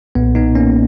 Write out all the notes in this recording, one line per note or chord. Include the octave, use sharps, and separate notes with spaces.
B1 A#2 B3
B3 D#4
A#3 C#4